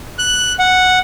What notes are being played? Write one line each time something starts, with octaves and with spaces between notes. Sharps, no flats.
F#6
F#5